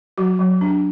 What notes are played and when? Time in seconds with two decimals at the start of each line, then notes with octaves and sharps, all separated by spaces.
0.18 F#3 F#4
0.39 F#3
0.61 D4